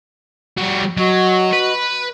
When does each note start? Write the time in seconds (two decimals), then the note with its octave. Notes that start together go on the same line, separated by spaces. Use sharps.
0.57 G3 F#4
0.98 F#3 F#4 D#5 C#6
1.52 B4